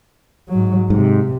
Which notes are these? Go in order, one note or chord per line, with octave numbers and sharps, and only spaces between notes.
G#2 F#3
G#2 C3